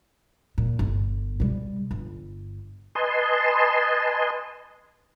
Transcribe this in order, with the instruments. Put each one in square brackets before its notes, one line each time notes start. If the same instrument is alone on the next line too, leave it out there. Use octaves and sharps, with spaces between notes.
[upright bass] A#2
G1
B2 G3
G1
[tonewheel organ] B4 D#5 G#5 A5 C6